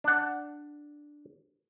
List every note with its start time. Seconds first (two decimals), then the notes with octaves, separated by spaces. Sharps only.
0.04 D4 F#5